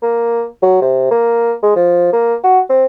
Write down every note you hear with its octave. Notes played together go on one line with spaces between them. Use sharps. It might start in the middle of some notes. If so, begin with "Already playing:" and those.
A#3
F#3
C3
A#3
G#3
F3
A#3
F#4
C4